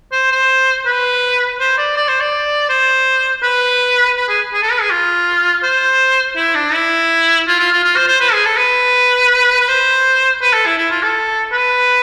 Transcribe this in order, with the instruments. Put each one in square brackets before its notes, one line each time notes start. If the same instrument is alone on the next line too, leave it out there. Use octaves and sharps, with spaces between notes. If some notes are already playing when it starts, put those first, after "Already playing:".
[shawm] C5
C5
B4
C5
D5
D5
C5
D5
C5
B4
B4
G#4
G#4
A4
B4
G#4
F4
C5
E4
D4
E4
F4
F4
F4
F4
C5
C5
B4
G#4
A4
B4
B4
C5
B4
A4
E4
E4
F4
A4
B4